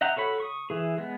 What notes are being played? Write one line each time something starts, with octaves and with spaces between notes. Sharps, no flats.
D#5 E5 F#5 G5 A#5
F#4 A4 C#5 B5
C#6 D#6
E3 G#4
G#3 B3